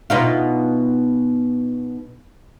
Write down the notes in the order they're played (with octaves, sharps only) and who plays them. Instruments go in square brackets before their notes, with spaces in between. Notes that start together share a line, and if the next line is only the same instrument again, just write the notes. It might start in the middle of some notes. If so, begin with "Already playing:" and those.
[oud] B2 D#4 F4